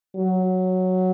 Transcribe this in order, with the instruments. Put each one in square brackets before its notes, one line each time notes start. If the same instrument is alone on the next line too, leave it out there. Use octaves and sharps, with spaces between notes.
[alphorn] F#3